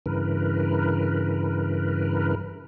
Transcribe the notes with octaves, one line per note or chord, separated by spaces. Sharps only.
G2 C#3 E3 A#4 B4